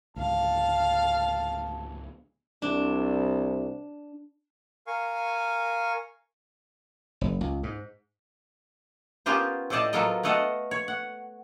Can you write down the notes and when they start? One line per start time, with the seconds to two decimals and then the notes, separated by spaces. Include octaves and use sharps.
0.16 C#2 G#2 D3 F5 A5
2.62 C2 D4
4.87 A#4 F5 G#5 C#6
7.21 F#1
7.41 C#2
7.63 G#2
9.26 B3 C#4 F4 G4 A#4 C5
9.70 A2 A4 C5 D5 D#5 A5
9.93 F#3 B3 F4 A4 A#4 D#5
10.23 A3 B3 A4 D#5 F5 F#5
10.71 C#5
10.88 F#5